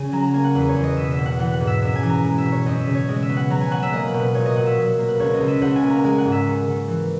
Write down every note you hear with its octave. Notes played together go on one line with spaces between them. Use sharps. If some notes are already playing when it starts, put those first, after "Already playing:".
Already playing: C#3 G#5
F#3 A#5
A#5
A#3 G#5
F#5
E2 B4
C#5
E2
D#5
B2 E5
E5
B2
F#5
E3 F#5
F#5
G#2
E5
F#2 E5
G#5
E3
A#5
G#3
E5
B2
C#5
F#2 D#5
E5
C#3
C#5
G#3 D#5
E5
B3
F#5
F#3 A#5
G#5
F#3 F#5
E5
A#3 D#5
B4
B2
B4
A#2 C#5
D#5
A#2 F#5
E5
F#3
A#3
B4
C#2 C#5
D#5
C#2
E5
C#2 F#5
G#5
A#3
A#5
G#3 G#5
F#5
G#2
E5
D#3
D#3
E3